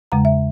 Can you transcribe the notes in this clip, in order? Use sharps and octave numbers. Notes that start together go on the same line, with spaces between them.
E2 C#3 G#3 A#5
E5